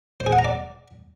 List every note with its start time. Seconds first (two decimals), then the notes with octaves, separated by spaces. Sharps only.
0.20 C5
0.26 G#4
0.32 F#5
0.39 A#5
0.45 D5